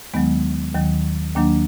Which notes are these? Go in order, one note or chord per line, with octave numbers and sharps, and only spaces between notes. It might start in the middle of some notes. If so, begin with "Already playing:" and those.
D#2 D#3 F#3 G#3 B3
D#2 D#3 F#3
D#2 D#3 F#3 A#3 D4